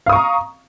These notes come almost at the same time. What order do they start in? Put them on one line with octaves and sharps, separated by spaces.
F5 D#6 C#6 A#5